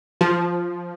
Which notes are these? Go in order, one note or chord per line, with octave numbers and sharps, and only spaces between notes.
F3